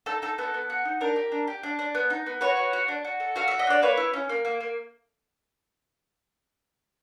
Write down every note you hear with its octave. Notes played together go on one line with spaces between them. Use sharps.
D#4 A4
D#4 A4
B3 A4
B3
F#4
D#4
D4 A#4
G4
D4
G4
D4
D4
B3
D#4
B3
F#4 B4 C#5
F#4
F#4
D4
F#4
A4
F#4 F5
F#4 E5
D#5
D4 D5
A#3 B4 C#5
E4
C#4
A#3
A#3
A#3